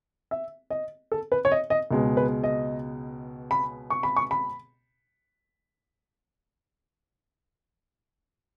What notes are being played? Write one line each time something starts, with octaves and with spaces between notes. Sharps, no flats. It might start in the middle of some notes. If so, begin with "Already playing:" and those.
E5
D#5
A4
B4
C#5
D#5
D#5
C#2 B2 G#3
B4
D#5
B5
C#6
B5
C#6
B5